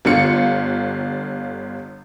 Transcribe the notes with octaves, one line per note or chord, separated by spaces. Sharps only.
G1 D3 F4 C#7